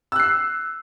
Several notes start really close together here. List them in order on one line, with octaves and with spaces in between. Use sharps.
E6 F#6 C7